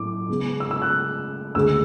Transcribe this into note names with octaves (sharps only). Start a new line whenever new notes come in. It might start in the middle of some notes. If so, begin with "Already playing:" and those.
Already playing: A2 F#3 A3 D6
C#3 G#3 B3
E6
E6
F#6
D2 C#3 G#3 E6